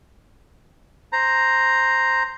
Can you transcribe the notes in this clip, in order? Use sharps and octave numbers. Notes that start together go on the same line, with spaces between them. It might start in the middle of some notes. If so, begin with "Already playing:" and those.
C5 A#5